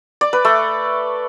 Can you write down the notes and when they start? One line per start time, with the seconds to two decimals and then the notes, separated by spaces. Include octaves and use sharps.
0.21 D5
0.33 B4
0.45 A3